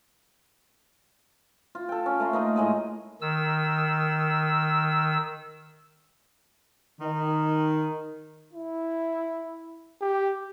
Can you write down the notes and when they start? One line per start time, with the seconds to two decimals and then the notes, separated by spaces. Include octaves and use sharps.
1.75 F4
1.89 A4 G5
2.06 C#4
2.20 A3 A#5 C6
2.33 A#3 D#4 D#5
2.56 A2 G#3 D#5
3.21 D#3 E6
7.01 D#3
8.53 E4
10.01 G4